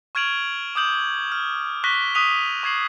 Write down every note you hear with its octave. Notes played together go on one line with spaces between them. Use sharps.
C#6 F6 G#6 D7 F7 F#7
D6 D#6 G6 F#7
F6
C#6 F#6 A#6 B6 G7
C#6 D#6 F#6 B6 D#7 F7
C#6 G#6 C7 F#7